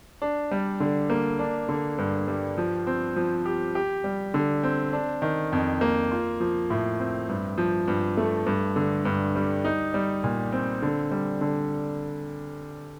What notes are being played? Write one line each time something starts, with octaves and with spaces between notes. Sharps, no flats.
D4
G3
D3
A#3
D4
D3
G2
G3
F3
C4
F3
G4
G4
G3
D3
C4
D4
D#3
F2
A#3
F4
F3
A2
C4
G2
F3
G2
A3
G2
D3
G2
G3
D#4
G3
A#2
C4
D3
G3
D3